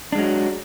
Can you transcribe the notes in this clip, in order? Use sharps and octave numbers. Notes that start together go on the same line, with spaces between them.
F#3 G#3 D4